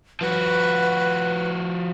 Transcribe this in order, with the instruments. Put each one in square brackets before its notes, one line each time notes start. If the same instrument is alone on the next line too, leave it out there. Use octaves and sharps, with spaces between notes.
[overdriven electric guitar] F3 F#4 [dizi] B4